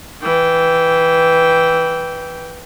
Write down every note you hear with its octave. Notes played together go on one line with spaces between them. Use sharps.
E3 G5